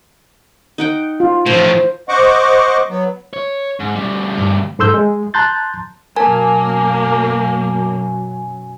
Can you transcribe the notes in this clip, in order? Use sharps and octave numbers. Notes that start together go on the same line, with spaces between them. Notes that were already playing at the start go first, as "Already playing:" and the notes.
D#4 F#5 G5
F4
A2 F3 C5
C5 D#5 F#5 C#6 D6
F#3 B3
C#5
G#2
D2 G3
G2
G#2 A4 C6 E6 G6
G#3
A5 A#5 C6 F#6 G6 A6
F#2 B2 F#3 A#3 A#4 G#5 A5